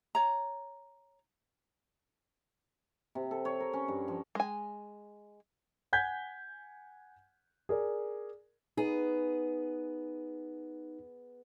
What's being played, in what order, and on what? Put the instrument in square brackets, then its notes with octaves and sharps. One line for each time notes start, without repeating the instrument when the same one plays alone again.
[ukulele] C#5 A#5
[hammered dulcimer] C3
A4
C#5
A#4
C#4
G2
F3
[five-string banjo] G#3 G#5
[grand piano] F#5 G#5 G6 G#6 B6
G#4 A#4 D5
[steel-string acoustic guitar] B3 G#4 [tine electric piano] D#4